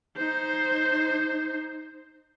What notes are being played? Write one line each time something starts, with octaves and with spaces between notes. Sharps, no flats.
D#4 C5